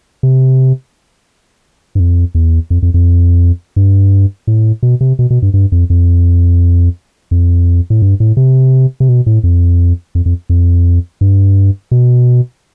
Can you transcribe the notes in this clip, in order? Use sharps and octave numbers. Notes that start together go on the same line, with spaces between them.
C3
G2
F2
E2
F2
F2
F2
G2
A2
B2
C3
B2
B2
G2
G2
F2
F2
F2
A2
G2
A2
C3
C3
B2
A2
F2
F2
F2
F2
G2
B2